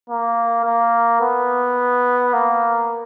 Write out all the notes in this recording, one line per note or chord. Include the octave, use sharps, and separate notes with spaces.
A#3
A#3
B3
A#3